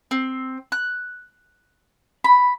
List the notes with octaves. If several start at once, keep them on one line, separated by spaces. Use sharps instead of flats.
C4
F#6
B5